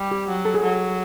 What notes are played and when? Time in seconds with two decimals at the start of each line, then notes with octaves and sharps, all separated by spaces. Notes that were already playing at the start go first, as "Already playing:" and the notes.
Already playing: G3
0.11 G4
0.29 F#3
0.45 A4
0.54 G#4
0.63 F#3 A4